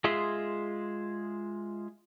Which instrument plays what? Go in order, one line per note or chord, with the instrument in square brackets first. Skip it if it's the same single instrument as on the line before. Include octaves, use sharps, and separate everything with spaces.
[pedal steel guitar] G#3 F4 G#4 E5 C6